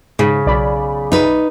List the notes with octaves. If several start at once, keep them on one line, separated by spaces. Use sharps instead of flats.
G#2 C#3
B1 D5 B5
D#4 B4